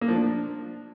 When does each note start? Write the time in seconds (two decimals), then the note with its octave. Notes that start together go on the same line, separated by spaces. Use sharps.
0.01 A#3
0.08 F3
0.15 D4